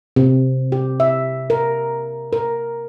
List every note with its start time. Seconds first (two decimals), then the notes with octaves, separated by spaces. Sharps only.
0.16 C3
0.72 G4
1.00 E5
1.50 A#4
2.33 A#4